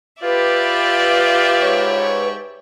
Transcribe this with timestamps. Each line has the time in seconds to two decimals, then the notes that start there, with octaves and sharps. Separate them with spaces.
0.22 F4 G4 B4 D5 E5
1.61 G#2 C#5